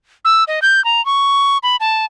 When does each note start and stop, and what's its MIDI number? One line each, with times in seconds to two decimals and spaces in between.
0.25 0.44 88
0.48 0.60 75
0.62 0.83 91
0.85 1.04 82
1.06 1.58 85
1.63 1.76 83
1.80 2.05 81